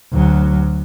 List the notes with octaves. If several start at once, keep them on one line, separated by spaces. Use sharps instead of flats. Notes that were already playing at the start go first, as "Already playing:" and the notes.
D2 F#3